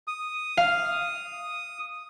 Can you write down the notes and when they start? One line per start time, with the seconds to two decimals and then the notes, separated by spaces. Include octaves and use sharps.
0.07 D#6
0.57 F5